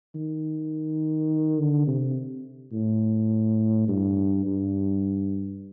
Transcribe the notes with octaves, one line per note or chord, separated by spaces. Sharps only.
D#3
D3
C3
A2
G2
G2